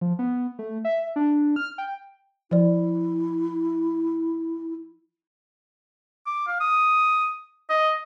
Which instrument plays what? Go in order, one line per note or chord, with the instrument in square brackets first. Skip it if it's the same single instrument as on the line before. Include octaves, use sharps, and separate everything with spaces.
[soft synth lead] F3
B3
A3
E5
D4
F6
G5
[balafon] F3 D5 [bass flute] E4
[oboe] D6
F5
D#6
D#5